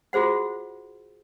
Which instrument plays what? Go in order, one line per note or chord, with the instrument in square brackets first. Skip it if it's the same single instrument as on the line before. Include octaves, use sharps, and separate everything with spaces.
[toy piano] F4 F#4 G#4 C5 F#5